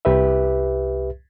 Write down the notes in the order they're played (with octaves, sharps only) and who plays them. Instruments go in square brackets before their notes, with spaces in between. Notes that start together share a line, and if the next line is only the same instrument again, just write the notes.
[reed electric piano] C2 G4 B4 E5